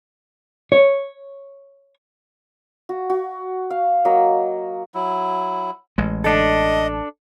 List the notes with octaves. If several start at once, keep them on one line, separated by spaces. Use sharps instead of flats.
C#5
F#4
F#4
F5
F#3 A#3 D#5
F#3 E4
A1 G#3
D4 A4 D#5